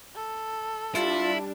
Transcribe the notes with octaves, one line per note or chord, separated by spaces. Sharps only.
A4
G3 D4 E4 F4